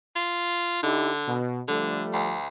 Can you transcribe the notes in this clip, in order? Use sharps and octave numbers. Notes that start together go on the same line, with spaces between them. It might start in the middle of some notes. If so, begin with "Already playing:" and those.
F4
D3 D#4 E4 G4
B2
D3 F3 G3 A3
D2